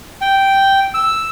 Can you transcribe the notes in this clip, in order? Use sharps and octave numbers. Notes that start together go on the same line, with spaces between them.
G5
E6